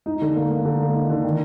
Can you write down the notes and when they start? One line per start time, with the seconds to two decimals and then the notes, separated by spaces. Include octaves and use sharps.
0.06 D#4
0.21 D3
0.36 A#3
0.50 A#3
0.65 D3
0.80 A#3
0.94 D#4
1.10 D3
1.24 D#3